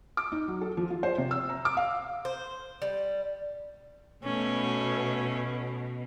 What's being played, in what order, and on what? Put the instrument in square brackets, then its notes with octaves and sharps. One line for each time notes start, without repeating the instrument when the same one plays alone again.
[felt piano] D6
D#4
F#3
A4
F3
F4
C5
C3
E6
A#5
D6
F5
[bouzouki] C5
G3
[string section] B2 [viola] A3 C#4